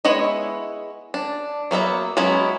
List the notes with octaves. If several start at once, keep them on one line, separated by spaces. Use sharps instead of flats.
G#3 B3 E4 C#5 D#5
D4
F#3 A#3 B3 E5
F#3 G#3 B3 C#4 E4